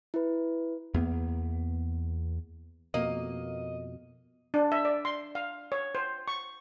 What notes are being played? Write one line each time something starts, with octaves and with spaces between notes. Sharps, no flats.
E4 B4
E2 A#3 B3
F2 B2 A#3 D#5
D4
E5
D5
C6
F5
C#5
C5
C#6